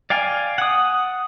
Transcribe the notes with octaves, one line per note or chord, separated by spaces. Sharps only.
D5 F5 G5 G#5
F#5 D#6